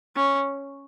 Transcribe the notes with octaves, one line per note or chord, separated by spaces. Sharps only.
C#4